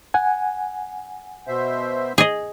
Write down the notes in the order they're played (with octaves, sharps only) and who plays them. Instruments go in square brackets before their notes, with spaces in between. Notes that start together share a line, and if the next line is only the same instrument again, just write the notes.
[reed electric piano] F#5 G#5
[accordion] B2 C5 E5
[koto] G#4 D#5